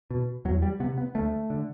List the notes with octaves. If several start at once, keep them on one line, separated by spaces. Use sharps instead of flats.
B2
E2 F#3
G3
C3 B3
B3
D2 A3
D3